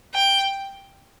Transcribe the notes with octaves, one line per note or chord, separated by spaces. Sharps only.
G5